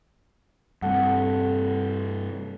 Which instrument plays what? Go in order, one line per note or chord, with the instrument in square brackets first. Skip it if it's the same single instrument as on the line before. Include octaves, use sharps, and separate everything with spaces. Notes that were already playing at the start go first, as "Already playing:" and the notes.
[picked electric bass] G2 C3 [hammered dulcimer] A3 F#5